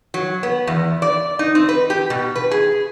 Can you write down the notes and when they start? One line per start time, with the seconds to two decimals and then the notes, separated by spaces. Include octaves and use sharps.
0.14 F#3
0.43 B3
0.67 E2
1.02 D5
1.39 D#4
1.55 C4
1.69 B4
1.90 G4
2.10 B2
2.36 B4
2.51 G#4